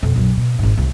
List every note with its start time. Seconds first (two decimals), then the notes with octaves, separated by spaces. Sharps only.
0.03 F2 B2
0.16 B1 F#2
0.37 B2
0.59 G#1 G#2
0.77 C2 A3